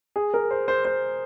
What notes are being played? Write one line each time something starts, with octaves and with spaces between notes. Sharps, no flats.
G#4
A#4
C5
C5
C5